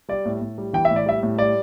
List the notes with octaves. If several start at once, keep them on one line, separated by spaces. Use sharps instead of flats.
G3 D5
A2
A2
G3
E3 G5
E5
A2
D5
G3 E5
A2
G3 D5